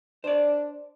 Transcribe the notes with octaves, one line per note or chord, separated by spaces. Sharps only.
D4 C5 D5